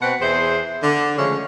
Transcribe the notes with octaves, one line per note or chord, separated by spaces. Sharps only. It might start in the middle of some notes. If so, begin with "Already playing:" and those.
B2 C4 F#4 B4 F#5
E2 E4 G#4 C5
D3
C#3 F3 G#3 A3 C#4